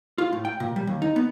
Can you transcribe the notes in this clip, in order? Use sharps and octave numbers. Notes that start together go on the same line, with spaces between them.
F4
A2
G5
A#2
G3
D#2
D#4
B3